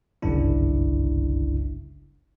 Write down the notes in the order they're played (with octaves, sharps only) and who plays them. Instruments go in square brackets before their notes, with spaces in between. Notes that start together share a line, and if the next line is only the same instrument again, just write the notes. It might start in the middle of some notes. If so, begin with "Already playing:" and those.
[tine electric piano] G1 C2 F#2 C#3 D4 E4